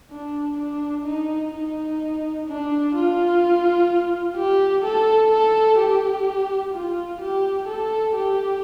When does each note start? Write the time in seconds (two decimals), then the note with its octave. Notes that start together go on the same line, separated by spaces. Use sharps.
0.11 D4
0.57 D4
1.05 D#4
1.53 D#4
2.47 D4
2.95 F4
4.37 G4
4.85 A4
5.31 A4
5.79 G4
6.74 F4
7.21 G4
7.68 A4
8.16 G4